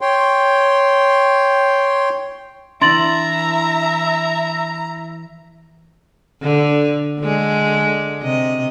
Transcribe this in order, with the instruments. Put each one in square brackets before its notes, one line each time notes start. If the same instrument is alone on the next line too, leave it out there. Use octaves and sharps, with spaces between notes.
[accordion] C#5 G5 C6
[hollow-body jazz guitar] E3 D4 [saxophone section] E4 E5 [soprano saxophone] A#5 [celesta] C6 A6 F#7
[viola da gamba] D3
D3 G#3
C3 D#5